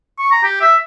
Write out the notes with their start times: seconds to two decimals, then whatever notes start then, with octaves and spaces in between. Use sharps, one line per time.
0.19 C#6
0.32 A#5
0.44 G4
0.61 E5